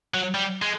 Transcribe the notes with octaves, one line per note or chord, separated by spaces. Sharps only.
F#3
G3
G#3